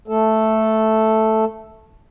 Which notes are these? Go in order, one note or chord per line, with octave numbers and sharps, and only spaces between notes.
A3 A4